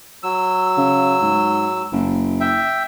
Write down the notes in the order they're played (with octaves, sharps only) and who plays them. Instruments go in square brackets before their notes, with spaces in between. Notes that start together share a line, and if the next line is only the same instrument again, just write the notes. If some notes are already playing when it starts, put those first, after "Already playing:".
[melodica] F#3 E6
[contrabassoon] C#3
G#2
F#1
[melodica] E5 G5